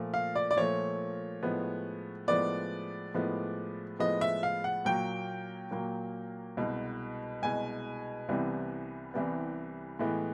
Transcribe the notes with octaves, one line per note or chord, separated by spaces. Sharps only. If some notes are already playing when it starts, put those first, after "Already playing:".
Already playing: A#2 F3 A3
F5
D5
D5
A#2 F3 A3 C#5
A2 F3 G#3 B3
A2 F3 G#3 B3 D5
A2 F3 G#3 B3
A2 F3 G#3 B3 D#5
E5
F5
F#5
A#2 F#3 A#3 G5
A#2 F#3 A#3
C2 B2 G#3
C2 B2 G#3 G#5
C2 C3 E3 G3 B3
C2 C3 E3 G3 B3
A2 E3 G#3 B3